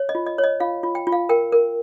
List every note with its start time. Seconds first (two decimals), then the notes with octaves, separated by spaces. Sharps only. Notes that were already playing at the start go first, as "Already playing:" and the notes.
Already playing: C#5
0.09 D#5
0.15 F4
0.26 D#5
0.38 C#5
0.44 D#5
0.60 F4 F5
0.83 F4
0.95 G5
1.07 F4
1.12 F5
1.29 A#4 G5
1.52 A#4